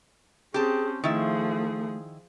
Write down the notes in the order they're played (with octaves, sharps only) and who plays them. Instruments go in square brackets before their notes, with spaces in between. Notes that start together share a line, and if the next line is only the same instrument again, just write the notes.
[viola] C4 C#4 [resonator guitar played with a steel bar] G4 A5 [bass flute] G#4
[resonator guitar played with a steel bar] D#3 E4 [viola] F3 G#4 [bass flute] A3